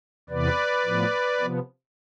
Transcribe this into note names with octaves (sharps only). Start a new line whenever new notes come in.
E2 C3 E3 B3 B4 D5
A2 F3 B3
C3 F3 B3